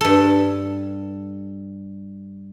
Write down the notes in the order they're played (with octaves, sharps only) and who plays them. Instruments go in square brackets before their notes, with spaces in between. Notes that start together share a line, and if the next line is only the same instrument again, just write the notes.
[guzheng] G2 A4